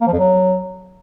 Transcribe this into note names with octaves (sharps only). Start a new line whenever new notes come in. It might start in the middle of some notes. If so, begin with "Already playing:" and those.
A#3
F3
F2
F#3